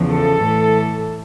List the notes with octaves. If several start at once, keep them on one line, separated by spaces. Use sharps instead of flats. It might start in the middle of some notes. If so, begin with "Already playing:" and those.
Already playing: E2 C#3 F3
A4
A2 E3